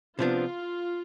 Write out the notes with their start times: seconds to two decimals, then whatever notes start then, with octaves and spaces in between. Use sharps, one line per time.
0.18 C3 F3 B3 D4 F4